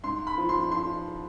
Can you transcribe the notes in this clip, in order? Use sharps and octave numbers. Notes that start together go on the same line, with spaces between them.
G#2 C6
B5
F3
C6
F3 C6